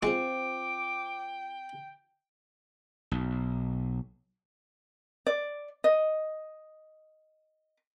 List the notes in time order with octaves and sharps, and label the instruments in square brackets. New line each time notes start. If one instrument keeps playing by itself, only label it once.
[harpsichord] G#3 [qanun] C4 F4 C#6 [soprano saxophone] G5 [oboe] D6
[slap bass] B1
[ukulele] D5
D#5